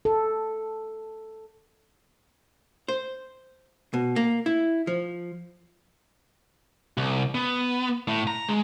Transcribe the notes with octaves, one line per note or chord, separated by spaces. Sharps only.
A4
C5
B2
A#3
E4
F3
C2
B3
A2
A#5
G#3